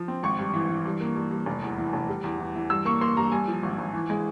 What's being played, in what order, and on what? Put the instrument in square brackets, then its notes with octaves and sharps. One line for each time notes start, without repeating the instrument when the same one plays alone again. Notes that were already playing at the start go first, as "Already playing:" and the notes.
Already playing: [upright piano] F3
C4
G#1 C#6
G2
E3
E3
G2
A#3
G2
G2
F1
E2
E3
F1
G3
E2
E3
E3
G2 E6
A#3 C#6
A#3 C6
G2 A#5
G2 G#5
F3
G#1
G#1
E3
G#3